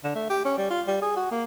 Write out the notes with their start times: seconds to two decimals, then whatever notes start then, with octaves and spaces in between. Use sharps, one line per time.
0.04 D3
0.15 A3
0.30 G4
0.45 C#4
0.57 G3
0.70 F4
0.88 G3
1.02 G#4
1.17 F#4
1.31 A#3